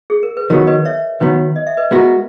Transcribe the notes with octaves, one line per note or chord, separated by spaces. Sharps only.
G#4
A#4
B4
D#3 F#3 B3 A#4 C#5
B4 D#5
C#5 E5
D#3 F#3 B3 B4
D#5
E5
B4 D#5
G#3 B3 F#4 A#4